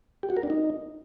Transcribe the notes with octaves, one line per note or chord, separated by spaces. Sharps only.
G4
F#4
A#4
D4
D#4